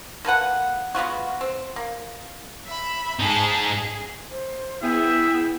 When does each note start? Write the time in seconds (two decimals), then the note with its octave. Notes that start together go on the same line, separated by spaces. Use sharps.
0.25 A#3 A4 B4 F#5
0.95 G#3 B3 F4 F#4
1.41 C4
1.76 A#3
2.67 E5 B5
3.19 G#2 D#4 G#4 A5
3.59 G#4
4.31 C5
4.82 B3 E4 G#4 E5 G5